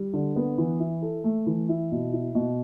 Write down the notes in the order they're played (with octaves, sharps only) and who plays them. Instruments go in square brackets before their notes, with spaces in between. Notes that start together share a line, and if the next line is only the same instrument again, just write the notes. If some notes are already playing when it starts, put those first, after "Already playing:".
Already playing: [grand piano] G3
D3
B3
E3
E4
A4
A3
E3
E4
B2
E4
B2